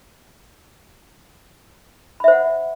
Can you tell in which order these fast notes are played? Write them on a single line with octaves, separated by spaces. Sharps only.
B5 E5 C5 F#5